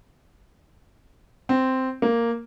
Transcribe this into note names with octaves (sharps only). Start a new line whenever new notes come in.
C4
A#3